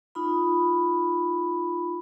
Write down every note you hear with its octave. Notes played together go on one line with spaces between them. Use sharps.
D#4 F4 B5